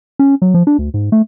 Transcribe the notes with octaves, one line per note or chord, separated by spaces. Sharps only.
C#4
F#3
F3
D4
D2
G#2
A3